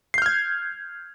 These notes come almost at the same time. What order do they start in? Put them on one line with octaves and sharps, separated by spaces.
C7 G6 F6 G#6